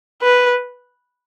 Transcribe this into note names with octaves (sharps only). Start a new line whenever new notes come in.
B4